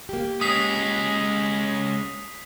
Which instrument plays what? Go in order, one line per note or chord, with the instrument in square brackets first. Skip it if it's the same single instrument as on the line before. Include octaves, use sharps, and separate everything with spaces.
[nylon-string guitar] A#3 G4
[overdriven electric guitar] G#3 C#4 [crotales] D#6 B6 C7